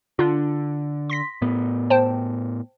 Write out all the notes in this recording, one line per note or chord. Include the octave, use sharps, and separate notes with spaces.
D3 D4 F4
C6 A#6 B6
A2 B3
C5 G5 A5